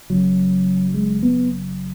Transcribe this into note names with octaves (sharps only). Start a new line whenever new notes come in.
F#1 F#2 C#3 F#3
G#3
B3